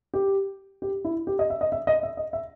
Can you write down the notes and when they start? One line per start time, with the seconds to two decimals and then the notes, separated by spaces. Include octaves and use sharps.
0.14 G4
0.82 G4
1.05 E4
1.27 G4
1.39 D#5
1.50 E5
1.61 D#5
1.72 E5
1.87 D#5
2.03 E5
2.17 D#5
2.33 E5